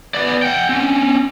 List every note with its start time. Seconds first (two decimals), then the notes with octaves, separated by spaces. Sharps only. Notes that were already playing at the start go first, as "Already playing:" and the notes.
0.14 B3 D5
0.42 F#5 G5
0.69 C4 C#4